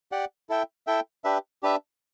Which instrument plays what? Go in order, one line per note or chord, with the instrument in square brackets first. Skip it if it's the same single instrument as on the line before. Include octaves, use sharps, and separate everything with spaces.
[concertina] G4 D5 F#5
E4 A4 E5 G5
E4 A4 E5 G5
D4 G4 B4 E5
D4 G4 B4 E5